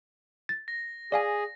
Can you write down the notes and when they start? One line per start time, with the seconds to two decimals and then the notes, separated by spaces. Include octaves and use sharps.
0.49 A6
0.68 A#6
1.12 G#4 D5 F5 G#5